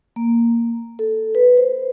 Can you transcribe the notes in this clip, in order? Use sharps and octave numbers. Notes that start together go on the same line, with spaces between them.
A#3
A4
B4
C5